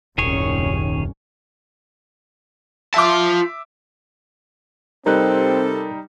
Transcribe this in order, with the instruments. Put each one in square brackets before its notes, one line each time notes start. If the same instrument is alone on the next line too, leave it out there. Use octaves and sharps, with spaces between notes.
[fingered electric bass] D#1 [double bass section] C2 F#2 C#4 [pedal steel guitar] D#3 G#4 C#5
[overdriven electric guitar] F4 A5 [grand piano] E5 D6
[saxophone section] C3 A4 [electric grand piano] G3 D#4 [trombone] C4 [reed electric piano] A#4 F#6